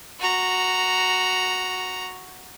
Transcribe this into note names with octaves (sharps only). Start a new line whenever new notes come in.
F#4 A#5